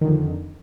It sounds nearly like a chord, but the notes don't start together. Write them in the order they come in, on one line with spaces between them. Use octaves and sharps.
D#3 D3 F2